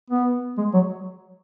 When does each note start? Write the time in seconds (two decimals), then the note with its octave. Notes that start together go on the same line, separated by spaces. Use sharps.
0.10 B3
0.58 G#3
0.74 F#3